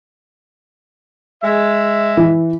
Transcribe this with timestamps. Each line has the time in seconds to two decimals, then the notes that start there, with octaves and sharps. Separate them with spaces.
1.43 G#3 E5
2.17 E3